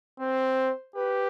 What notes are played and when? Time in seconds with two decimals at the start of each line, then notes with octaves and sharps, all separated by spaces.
0.19 C4 C5
0.95 G4 B4